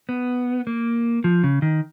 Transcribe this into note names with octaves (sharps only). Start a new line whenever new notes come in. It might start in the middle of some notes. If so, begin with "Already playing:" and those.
B3
A#3
F3
C#3
D#3